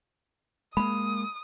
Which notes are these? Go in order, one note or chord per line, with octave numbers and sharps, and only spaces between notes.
G#3 A#3 B5 D#6